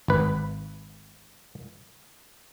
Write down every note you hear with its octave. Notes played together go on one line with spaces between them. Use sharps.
G#1 B4